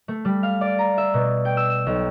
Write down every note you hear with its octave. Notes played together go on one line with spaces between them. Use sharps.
A3
G3
F5
D5
A#5
E5
B2
G5
E6
E7
B1